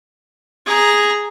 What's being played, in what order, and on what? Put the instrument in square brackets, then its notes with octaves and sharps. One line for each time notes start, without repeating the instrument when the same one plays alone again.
[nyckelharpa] G#4 A#5